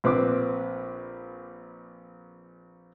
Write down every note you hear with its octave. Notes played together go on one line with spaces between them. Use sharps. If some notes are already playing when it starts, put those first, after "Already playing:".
A#1 C4 B4 D6